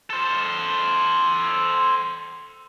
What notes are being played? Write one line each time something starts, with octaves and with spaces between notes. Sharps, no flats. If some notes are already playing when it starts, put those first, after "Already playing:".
A4 C5